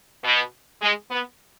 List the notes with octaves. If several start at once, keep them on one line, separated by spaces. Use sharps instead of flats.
B2
G#3
B3